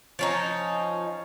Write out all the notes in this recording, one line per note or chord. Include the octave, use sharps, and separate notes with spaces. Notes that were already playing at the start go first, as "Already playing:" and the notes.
F3 C#4 D#4